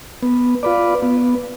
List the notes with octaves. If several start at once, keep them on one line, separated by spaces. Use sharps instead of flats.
B3
F4 B4 D5
B3